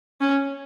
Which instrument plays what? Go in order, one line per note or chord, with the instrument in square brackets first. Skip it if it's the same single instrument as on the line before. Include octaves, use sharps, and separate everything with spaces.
[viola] C#4